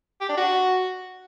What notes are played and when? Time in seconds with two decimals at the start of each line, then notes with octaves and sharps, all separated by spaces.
0.21 G4
0.29 D4
0.37 F#4